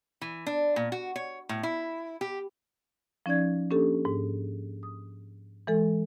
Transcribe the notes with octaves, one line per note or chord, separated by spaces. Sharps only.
E3
D4
A#2
F#4
C#5
A2
E4
G4
F3 C#4 D#4 D5 G#6
A#3 C#4 D4 G4 A4
G#2
D#6
E3 G#3 A4